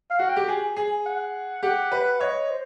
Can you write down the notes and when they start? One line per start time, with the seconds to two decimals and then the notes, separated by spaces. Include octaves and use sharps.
0.11 F5
0.19 F#4 F#5
0.29 G5
0.36 G4
0.48 G#4
0.76 G#4
1.06 F#5
1.63 G4 F#5
1.92 B4
2.20 C#5 D#5
2.50 C5